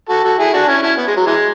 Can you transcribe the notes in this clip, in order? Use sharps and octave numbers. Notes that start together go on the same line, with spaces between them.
F#4 A4
F#4 A4
E4 G#4
D4 F#4
C#4 E4
C#4 E4
B3
G#3
F#3
E3 G#3